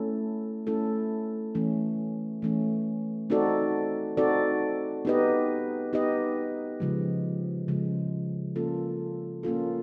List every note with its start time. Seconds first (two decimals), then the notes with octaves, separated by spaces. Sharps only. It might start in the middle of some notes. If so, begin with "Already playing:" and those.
Already playing: A3 C#4 E4 A4
0.67 A3 C#4 E4 A4
1.55 E3 A3 C#4
2.42 E3 A3 C#4
3.30 C4 D#4 F#4 A4 D5
4.17 C4 D#4 F#4 A4 D5
5.05 B3 D#4 G4 B4 D#5
5.93 B3 D#4 G4 B4 D#5
6.80 C#3 F3 G#3
7.68 C#3 F3 G#3
8.56 A#3 C#4 F4 A4
9.43 A#3 C#4 F4 A4